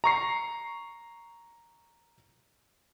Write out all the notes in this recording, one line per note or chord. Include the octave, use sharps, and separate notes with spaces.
A#5 C#6 C7